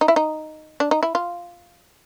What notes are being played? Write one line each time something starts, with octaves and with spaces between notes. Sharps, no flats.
D#4
E4
D#4
D4
D#4
E4
F4